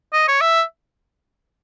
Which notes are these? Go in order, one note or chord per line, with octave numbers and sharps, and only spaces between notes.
D#5
C#5
E5